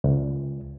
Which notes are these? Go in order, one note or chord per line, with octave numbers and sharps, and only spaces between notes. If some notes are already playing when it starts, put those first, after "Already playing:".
C#2